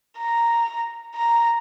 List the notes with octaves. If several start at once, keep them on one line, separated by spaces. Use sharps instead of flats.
A#5
A#5